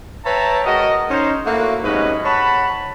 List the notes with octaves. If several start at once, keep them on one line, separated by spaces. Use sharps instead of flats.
B4 C#5 E5 G5 A5 A#5
G#3 F#4 A#4 D#5
C#4 D#4 C5
A3 A#3 E4 F#4
G#2 C3 F#3 C#4 B4 D#5
C#5 F#5 A5 B5